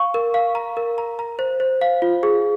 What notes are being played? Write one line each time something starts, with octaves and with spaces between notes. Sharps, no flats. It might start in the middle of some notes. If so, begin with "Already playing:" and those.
Already playing: F5 C#6
A#4
F5
A#5
A#4
A#5
A#5
C5
C5
F5
F4
G#4